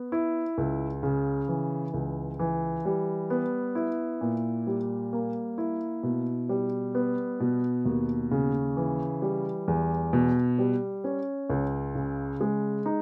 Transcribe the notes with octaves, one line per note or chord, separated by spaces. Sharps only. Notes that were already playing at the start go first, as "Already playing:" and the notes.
Already playing: B3
E4
C#2
C#3
E3
C#2
E3
G3
B3
E4
A#2
G3
A#3
E4
B2
G3
B3
B2
D#2
C#3
E3
G3
E2
B2
G3
C#4
C#2
C#3
G#3
D#4